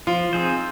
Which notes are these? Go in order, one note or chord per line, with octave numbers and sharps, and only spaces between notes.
F3 F4
C4 D#4 G#4 C5